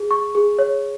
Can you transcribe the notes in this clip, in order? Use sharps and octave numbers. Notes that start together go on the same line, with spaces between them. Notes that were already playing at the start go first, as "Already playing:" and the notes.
Already playing: G#4
C#6
G#4
C#5